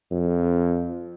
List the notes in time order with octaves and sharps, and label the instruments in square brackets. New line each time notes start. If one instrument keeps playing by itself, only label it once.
[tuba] F2